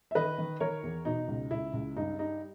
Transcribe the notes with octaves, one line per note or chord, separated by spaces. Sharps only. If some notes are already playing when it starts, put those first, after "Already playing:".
E5
D#3 B4 D#5
D#3
D#3 A#4 C#5
E2
B2 D#4
C#2
C#2 E4
C#2
G2 D#4
G3 D#4